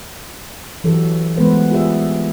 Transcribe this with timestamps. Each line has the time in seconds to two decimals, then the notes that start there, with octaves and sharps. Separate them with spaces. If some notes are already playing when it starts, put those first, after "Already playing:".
0.84 E3 F#3 F#4 G4 A4
1.37 E3 G#3 A3 B3 B4 C5
1.71 F4 G4 G#4 B4 D5 E5